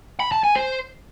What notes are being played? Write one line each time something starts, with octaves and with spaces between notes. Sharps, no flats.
B5
A5
G#5
C5